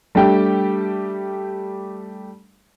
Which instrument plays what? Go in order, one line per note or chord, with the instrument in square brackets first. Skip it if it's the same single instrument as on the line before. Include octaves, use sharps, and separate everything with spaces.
[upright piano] G3 A3 D4 G4 G5